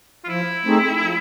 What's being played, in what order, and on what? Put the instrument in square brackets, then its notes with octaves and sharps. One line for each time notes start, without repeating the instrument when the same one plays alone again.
[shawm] F4
[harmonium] F3 [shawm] E4
[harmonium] A3 C4 D#4 G#4
F3